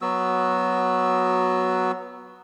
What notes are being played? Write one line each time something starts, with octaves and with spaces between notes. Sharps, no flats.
F#3 B3 F#4 E6